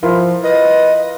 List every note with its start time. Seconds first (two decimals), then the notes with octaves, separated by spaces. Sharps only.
0.03 F3 E4 F4 A#4
0.43 B4 D#5